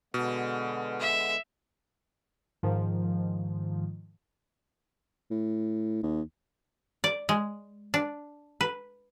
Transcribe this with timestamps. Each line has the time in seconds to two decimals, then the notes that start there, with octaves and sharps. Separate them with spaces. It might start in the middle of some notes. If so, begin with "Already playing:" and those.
0.14 B2 D3 G#3 B3
1.00 E5
2.63 G#2 D#3 F3
5.31 A2
6.03 D#2
7.04 D5
7.29 G#3
7.94 D4
8.61 B4